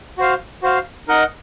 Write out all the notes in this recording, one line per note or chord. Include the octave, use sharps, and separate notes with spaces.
F#4 C5 F5
F#4 C5 F5
D#4 A#4 D#5 F#5